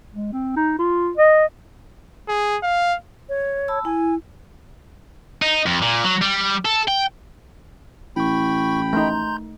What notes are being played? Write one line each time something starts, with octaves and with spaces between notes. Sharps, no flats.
G#3
C4
D#4
F4
D#5
G#4
F5
C#5
A5 B5 E6
E4 G#5
D#4
F2
A#2
F#3
G3
A4
G5
A1 E4 G5 B5 C#6
A3 D#4 A#5 C6 G6